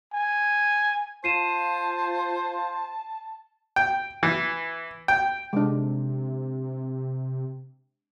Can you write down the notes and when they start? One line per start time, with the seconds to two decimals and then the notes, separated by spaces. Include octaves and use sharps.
0.14 G#5
1.24 F4 C5 A5 C7 D#7 E7
3.76 G5
4.23 E3
5.08 G5
5.53 C3 G#3 D4